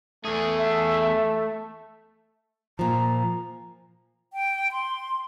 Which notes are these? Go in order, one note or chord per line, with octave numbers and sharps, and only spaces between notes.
E2 A3 G#4
E5
A#2 F3 A#5
G5
C6